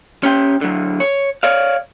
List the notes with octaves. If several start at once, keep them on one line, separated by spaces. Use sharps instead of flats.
C#4 G4 G5
D3 F#3
C#5
C#5 D5 F5